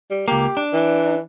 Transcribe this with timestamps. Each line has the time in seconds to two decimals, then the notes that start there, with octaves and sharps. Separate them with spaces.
0.10 G3
0.28 C#2 A#3 G4
0.57 D4
0.73 E3